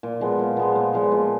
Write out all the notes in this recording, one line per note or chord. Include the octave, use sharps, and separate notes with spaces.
A#2
F3 G#3 B3
A#2
F3 G#3 B3
A#2
F3 G#3 B3
A#2